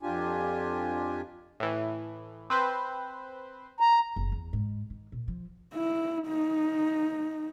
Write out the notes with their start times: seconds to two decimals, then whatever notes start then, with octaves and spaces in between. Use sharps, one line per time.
0.02 F2 D4 F4 G4 G#5
1.60 A2 E3
2.50 C4 B4 C5
3.81 A#5
4.16 F#1
4.32 E2
4.53 G#2
4.90 D#3
5.12 A#2
5.28 F3
5.74 E4
6.27 D#4